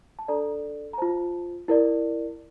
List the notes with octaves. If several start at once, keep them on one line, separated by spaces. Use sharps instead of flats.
A5
D4 A4 D5 A#5
A#5
F4 C5 A5
E4 A#4 D5